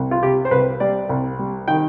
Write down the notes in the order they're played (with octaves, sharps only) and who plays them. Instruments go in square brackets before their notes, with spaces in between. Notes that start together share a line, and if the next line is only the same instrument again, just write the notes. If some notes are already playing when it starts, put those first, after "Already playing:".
Already playing: [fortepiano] C2
F4
C3 G4
C5
C2 B4
G3 D5
C2
G3
D#3 G5